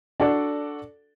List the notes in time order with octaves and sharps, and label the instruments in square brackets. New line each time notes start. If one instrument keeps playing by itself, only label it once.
[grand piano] D4 F#4 A4 D5